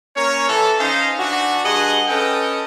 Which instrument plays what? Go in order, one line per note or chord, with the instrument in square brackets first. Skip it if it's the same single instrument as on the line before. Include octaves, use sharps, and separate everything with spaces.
[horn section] A#3 C#4 A#4 C#5
E3 A4
C#4 D#4 C5 D#5 F5
E3 D4 F#4
G2 G#4 D#5 F#5
C#4 A4 B4 D#5 G5